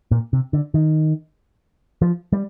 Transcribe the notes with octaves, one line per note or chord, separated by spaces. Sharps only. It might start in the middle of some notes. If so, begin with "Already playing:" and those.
A#2
C3
D3
D#3
F3
G3